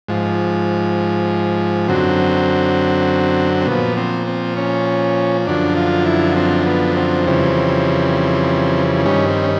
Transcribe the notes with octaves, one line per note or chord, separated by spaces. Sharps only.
G#2 F3
F#2 D3 F#3 C4
C4
A#2 F3 B3
C4
C4
C#4
F#2 D3 F3 D4
F4
E4
C4
B3
C4
F2 C#3 E3 G3
G2 D#3 G3 C#4
C4
C#4